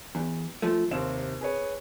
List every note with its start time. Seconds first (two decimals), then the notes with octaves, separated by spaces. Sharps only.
0.15 E2
0.62 F3 A3
0.91 D#2 C3 C4 E7
1.41 G#4 B4 C#5